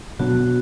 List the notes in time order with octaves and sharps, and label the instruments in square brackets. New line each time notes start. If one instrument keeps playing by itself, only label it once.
[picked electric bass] B2 F#3 B3 D4 [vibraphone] F#4